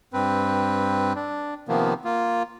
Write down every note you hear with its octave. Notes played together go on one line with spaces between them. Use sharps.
G2 C4 B4
D4
C3 D#3 F3 A#3 B3
A#3 F4